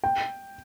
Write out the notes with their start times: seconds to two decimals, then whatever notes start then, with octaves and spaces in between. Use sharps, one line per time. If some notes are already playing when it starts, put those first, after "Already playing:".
0.04 G5